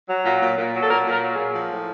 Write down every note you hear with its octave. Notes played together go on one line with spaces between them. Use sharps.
F#3
A#2
A#2
A#2
F#3
A4
A#2 A#4
A#2 A#4
F#3
A#2 G#4
F3
A2